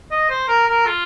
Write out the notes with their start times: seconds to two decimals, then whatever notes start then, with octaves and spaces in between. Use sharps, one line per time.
0.11 D#5
0.29 C5
0.48 A#4
0.67 A#4
0.86 F4